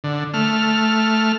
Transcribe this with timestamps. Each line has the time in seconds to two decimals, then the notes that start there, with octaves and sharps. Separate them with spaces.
0.04 D3
0.34 A3 F6